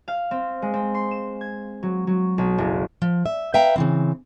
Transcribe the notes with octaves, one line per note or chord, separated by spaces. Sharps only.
F5
C4
G#3
C4
C6
E7
G#6
F#3
F#3
B1
F#1
F3
E5
B4 E5 F5 G5 A#5
C#3 E3 C4